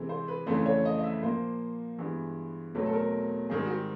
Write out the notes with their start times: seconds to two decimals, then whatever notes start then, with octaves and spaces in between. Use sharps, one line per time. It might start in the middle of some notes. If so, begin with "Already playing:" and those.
Already playing: C3 E3 G#3 C4
0.09 C5
0.28 B4
0.46 F2 C#3 E3 A3 C4 C5
0.66 C#5
0.85 D#5
0.99 D#5
1.04 E5
1.23 A#2 F3 A#3 C5
1.98 G2 E3 G#3 B3
2.74 E2 B2 F#3 A3 C4 B4
2.86 A4
2.93 A#4
3.50 G#2 D#3 G3 C4 G#4
3.65 F#4
3.70 G4